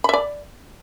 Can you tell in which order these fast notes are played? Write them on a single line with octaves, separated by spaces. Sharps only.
B5 E5 D5